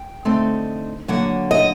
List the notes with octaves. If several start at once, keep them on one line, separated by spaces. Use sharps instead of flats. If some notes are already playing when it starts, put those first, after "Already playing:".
Already playing: G5
D3 A3 C4 D#4
D3 F#3 A#3 F#5
D#5